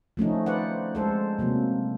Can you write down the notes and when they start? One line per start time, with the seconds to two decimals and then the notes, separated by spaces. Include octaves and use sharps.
0.17 F3 A3 C#4 D#4
0.46 B4 C5 D5 F#5
0.95 G#3 A4 C5
1.39 C3 F#3 A#3